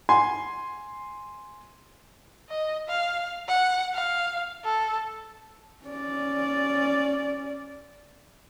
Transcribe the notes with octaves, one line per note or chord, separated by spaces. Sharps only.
G#5 C6
D#5
F5
F#5
F5
A4
C#4 D5